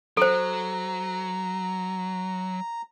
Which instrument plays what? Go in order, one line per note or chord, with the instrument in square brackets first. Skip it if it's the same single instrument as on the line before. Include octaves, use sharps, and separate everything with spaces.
[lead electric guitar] F#3 [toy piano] A4 C5 [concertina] A#5